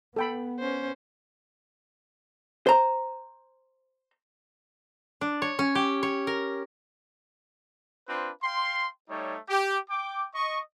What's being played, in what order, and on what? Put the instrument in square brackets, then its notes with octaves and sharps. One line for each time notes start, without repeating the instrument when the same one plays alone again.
[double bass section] B3 [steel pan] A4 G5 B5
[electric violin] C#4 C5
[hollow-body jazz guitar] C5 A#5
[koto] D4
C#5
C#4
G4
C#5
A#4
[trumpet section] C4 D4 F4 B4 C5
F5 G5 C6
G3 A3 D#4 C#5
G4
G5 D6
D#5 C#6